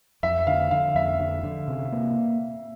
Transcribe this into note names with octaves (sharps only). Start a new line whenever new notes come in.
F2 E5
D3 F5
D3 F5
F2 E5
D3
D3
C3
A#3